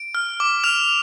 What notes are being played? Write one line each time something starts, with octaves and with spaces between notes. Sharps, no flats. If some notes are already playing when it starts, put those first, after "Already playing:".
Already playing: D7
F6
D6
F6 F7